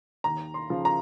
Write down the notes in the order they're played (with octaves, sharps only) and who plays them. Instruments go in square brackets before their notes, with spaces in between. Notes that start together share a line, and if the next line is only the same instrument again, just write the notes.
[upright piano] D#2 A#5
C6
C#3 F3
A#5